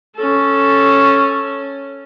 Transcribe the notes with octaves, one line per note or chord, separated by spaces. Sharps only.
C#4 A4